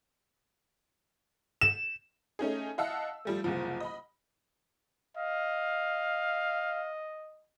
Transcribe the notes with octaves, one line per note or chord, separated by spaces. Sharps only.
E7
A3 C#4 D#4 G#4
E4 D#5 F5 F#5 A5 E6
F3 G3 A3
F#1 C2 F3
D#5 B5
D#5 F5